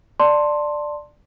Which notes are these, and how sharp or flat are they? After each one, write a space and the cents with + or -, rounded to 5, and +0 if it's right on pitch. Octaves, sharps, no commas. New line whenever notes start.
D5 +10 A5 +20 C6 +10